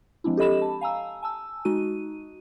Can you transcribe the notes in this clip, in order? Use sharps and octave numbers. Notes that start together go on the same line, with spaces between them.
F3 G#3 C4 D4 E4
G4 A4 D#5 B5 E7
A5
F5 G#5 A#5 E6
G#5 A5 E6
G#3 D#4 F#4 D#7